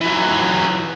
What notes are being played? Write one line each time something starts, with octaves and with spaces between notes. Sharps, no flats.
E3 F#3